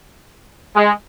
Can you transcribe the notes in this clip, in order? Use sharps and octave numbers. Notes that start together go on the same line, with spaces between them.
G#3